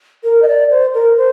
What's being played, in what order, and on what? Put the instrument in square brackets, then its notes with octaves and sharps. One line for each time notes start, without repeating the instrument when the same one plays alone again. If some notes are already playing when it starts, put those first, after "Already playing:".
[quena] A#4
D#5
D5
C5
A#4
C5